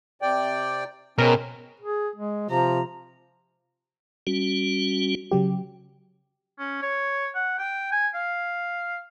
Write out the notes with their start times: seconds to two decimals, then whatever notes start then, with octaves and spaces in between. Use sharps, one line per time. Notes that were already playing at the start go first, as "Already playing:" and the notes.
0.22 C3 D5 G5
1.18 B2 G#3 C4 C#4 A#4
1.80 G#4
2.16 G#3
2.50 C3 F3 A#5
4.27 G3 C#4 F#4
5.31 C#3 F#3 G4
6.59 C#4
6.82 C#5
7.35 F#5
7.59 G5
7.92 G#5
8.14 F5